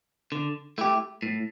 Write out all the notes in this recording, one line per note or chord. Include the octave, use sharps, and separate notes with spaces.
D3
A3 E4 G4
A2